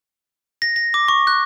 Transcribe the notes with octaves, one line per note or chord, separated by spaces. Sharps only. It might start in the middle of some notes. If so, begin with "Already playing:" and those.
A#6
A#6
D6
C#6
F#6